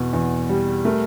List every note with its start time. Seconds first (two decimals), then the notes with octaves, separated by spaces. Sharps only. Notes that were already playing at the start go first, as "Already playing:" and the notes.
Already playing: E2 B2
0.13 E2
0.49 G3
0.85 A3 A#4